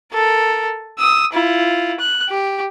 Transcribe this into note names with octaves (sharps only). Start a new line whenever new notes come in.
A4 A#4
D#6 E6
E4 F4
F#6
G4